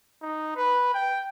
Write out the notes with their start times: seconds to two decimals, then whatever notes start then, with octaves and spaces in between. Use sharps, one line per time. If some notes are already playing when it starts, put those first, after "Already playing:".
0.22 D#4
0.56 B4
0.94 G5